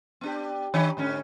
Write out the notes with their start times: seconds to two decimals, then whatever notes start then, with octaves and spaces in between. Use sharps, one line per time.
0.21 B3 D4 G4
0.74 D#3 D4 C#5
0.97 G#2 D3 C#4